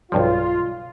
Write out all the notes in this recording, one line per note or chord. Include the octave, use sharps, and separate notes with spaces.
B1 G2 F3 F4